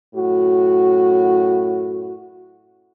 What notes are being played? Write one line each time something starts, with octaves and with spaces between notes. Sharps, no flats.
F#2 A2 F#4